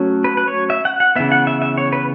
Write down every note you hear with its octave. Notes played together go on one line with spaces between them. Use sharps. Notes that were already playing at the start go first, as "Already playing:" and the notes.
Already playing: F#3 A3 C#4
B4
B4
C#5
E5
F#5
F#5
C#3 E3 B3 E5
F#5
E5
E5
C#5
B4